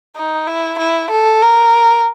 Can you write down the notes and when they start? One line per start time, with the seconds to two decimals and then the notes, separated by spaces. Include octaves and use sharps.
0.16 D#4
0.47 E4
0.79 E4
1.10 A4
1.42 A#4